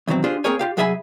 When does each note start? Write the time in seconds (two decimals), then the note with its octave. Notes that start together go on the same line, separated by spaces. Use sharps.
0.08 E2 B2 D#3 F#3 C4
0.24 D4 F4 G4 G#4 C5
0.44 A#3 C4 G#4 A#4 C#5 G#5
0.59 F4 G4 F5
0.77 C2 F#3 G#4 E5 G#5 B5